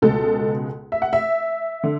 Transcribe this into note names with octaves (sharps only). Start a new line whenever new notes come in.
C#2 B2 G#3 A4
E5
F#5
E5
D3